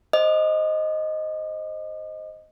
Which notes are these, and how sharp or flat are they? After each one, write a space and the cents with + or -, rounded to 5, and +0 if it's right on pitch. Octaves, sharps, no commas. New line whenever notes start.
C5 +0 D#5 +0 D6 +45